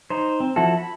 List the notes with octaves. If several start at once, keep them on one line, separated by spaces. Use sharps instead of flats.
D#4 C5
C4
F3 E4 F#4 A4
B5